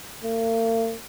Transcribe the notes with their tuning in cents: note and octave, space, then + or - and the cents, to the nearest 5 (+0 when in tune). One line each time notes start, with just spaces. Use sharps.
A#3 -45